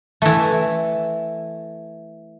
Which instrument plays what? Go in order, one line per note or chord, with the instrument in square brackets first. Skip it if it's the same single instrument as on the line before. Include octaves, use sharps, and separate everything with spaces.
[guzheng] E3 A3